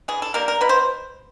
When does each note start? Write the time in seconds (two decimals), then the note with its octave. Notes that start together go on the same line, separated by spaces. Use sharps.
0.08 E3 G#4
0.22 A4
0.34 G3 A#3 A#4
0.48 A#4
0.61 B2 B4
0.69 C5